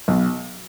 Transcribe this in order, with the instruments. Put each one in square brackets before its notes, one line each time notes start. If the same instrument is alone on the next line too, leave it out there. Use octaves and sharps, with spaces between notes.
[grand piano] B1